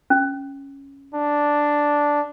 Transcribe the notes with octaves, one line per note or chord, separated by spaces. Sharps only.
C#4
D4